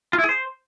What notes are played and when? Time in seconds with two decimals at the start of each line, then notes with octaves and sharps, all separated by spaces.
0.13 F4
0.18 E4
0.24 G#4
0.29 C5